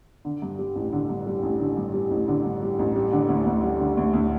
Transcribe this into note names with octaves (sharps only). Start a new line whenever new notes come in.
D3
G2
G3
A1
D3
G2
G3
A1
D3
G2
G3
A1
D3
G2
G3
A1
G3
D3
D2
D2
G3
D3
D2
D2